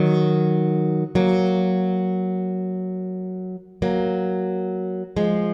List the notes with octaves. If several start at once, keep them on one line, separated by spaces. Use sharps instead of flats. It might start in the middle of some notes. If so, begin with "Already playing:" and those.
Already playing: D#3 F#3
F#3 A#3
F#3 A#3
F3 G#3